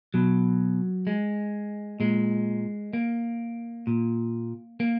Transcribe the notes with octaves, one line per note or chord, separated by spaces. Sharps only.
B2 F#3
G#3
A#2 G#3
A#3
A#2
A#3